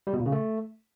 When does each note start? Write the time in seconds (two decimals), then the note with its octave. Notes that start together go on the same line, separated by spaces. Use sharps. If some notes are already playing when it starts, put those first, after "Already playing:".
0.07 G3
0.13 B2
0.19 A#2
0.26 C#3
0.32 A3